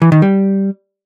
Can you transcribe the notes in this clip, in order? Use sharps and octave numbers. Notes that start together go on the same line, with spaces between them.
E3
D#3
G3